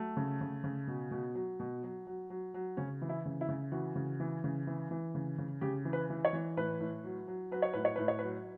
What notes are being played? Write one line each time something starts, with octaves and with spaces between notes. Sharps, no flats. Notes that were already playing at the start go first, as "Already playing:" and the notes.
Already playing: F#3 A3
C#3
C#3
C#3
B2
B2
F#3
B2
F#3
F#3
F#3
F#3
C#3 C#4
E3
E4
C#3
E4
C#3
E3 F#4
C#3
E3
C#3
E3
E3
C#3
C#3
C#3 G4
E3
B4
E3
C#5
E3
A2 B4
A2
F#3
F#3
F#3 B4
C#5
A2 B4
C#5
A2 B4
C#5
B4
F#3